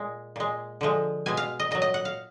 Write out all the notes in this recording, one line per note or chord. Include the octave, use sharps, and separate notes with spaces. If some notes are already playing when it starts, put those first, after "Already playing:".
Already playing: A#2 G#3
A#2 G#3
D3 F3 G#3
B2 G#3 G#5
F5
D#5
A#2 F#3 D#5
D#5
F#5
F5